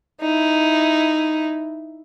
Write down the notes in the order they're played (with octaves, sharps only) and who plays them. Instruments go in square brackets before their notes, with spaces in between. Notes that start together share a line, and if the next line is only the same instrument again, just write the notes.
[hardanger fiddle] D#4 E4